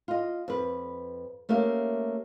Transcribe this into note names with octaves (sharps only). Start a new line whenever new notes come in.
F4 D#5
F2 B4
A3 A#3 C#4 G4 E5